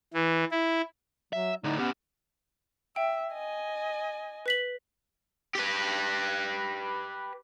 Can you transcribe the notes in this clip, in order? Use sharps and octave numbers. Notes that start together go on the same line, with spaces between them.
E3
E4
F#3 E5
A2 D3 D#4
B3 C#4 G4
E5 G5
D#5 G#5
B4 B6 F#7
G4 B4